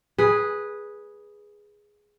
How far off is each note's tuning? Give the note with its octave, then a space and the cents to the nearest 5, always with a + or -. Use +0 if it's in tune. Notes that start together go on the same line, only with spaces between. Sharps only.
G#4 +0 B4 -10